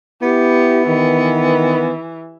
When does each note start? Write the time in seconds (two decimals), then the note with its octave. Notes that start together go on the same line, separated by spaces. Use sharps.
0.22 B3 E4 G4
0.87 D#3 E3